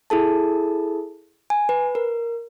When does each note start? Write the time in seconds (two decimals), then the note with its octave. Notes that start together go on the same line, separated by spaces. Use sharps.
0.10 E4 G#4 A4 A5
1.50 G#5
1.69 B4
1.95 A#4